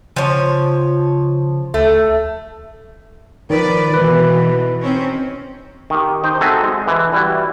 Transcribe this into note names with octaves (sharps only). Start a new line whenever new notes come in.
C#3 F3 C#5
D2 A3
D#3 F3 B4 D5
B2 E3 B4
D#3 C4 C#4
D#3 G4
D#4 C5 G5
C4 D#4 F#4 G#4 A4 E5
G#3
E3
E3 G3 E4 F#4